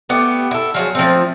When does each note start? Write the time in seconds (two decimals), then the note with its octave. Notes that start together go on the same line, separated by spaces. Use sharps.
0.09 A3 B3 G4
0.51 E4 A4
0.74 F3 F#3 G#4
0.95 F3 A3 C4